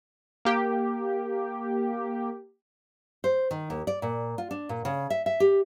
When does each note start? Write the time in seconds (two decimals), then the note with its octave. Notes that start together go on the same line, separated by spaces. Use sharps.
0.45 A#3 G4
3.24 C5
3.51 D#3
3.70 D#2
3.87 D5
4.02 A#2
4.38 F4
4.51 D4
4.69 A#2
4.85 C#3
5.10 E5
5.26 E5
5.40 G4